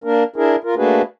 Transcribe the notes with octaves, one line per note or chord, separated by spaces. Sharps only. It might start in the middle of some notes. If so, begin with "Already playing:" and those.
A#3 D4 A#4
D4 E4 G#4 A#4
F4 A#4
A3 A#3 D4 F#4 G#4 B4